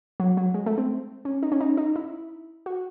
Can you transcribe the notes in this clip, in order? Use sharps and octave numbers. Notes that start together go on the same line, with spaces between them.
F#3
F#3
G#3
A3
C4
C#4
D#4
C#4
D#4
D#4
E4
F#4